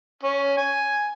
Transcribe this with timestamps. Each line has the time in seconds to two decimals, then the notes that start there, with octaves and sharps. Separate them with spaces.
0.23 C#4
0.57 G#5